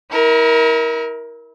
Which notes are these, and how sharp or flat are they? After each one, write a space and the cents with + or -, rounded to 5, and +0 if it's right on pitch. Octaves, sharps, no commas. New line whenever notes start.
E4 -35 A#4 +15